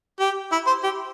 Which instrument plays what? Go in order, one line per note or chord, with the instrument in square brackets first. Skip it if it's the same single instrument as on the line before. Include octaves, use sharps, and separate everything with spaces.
[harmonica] G4
E4
C5
G4